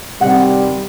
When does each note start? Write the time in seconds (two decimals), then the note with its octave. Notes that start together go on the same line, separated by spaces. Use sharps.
0.21 C3 D#3 G3 F#5